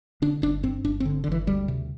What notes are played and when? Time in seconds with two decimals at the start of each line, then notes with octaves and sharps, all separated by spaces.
0.22 D3 D4
0.42 G1 D4
0.63 G2 C4
0.84 G1 D4
1.00 C4
1.05 D3
1.24 D3
1.26 G1
1.32 E3
1.47 D2 G3
1.68 C3